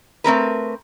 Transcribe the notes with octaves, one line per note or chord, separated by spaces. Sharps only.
A3 C4 A#4 B4